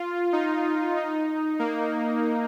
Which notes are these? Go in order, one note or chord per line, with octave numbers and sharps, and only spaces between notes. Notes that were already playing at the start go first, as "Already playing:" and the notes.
Already playing: F4
D#4
D#4
A#3